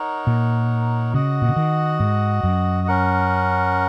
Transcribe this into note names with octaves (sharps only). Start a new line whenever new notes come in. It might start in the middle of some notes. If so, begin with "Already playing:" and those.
Already playing: D#4 A#4 C#5 F#5
A#2
C#3 F#4 D#5 F#5
A#2
C#3
D#3
G#2
F#2
C#4 A#4 F#5